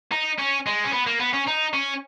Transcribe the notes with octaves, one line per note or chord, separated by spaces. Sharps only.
D#4
C#4
G#3
C#4
B3
A#3
B3
C#4
D#4
C#4